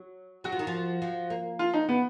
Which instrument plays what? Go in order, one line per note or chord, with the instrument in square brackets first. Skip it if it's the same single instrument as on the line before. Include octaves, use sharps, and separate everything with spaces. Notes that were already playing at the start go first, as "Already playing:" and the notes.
Already playing: [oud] F#3
[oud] F#3 [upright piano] F#4
[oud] F3
D#3
F3
F3
A#3
[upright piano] F4
D#4
B3